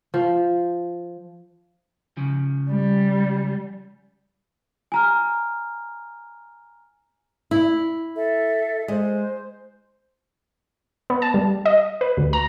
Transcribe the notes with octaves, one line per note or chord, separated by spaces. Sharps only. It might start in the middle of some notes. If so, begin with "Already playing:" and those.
F3
C#3 F3
G3
G#5 A#5 F6
E4
A4 E5
G#3 C5
B3
A5
G3
D#5
B4
D2
A#5